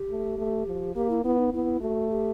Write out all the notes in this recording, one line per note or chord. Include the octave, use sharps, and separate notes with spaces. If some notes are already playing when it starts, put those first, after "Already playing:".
Already playing: G4
A3
A3
F3
A#3 G4
E4
B3 E4
D#4
B3 E4
A3 F#4
G4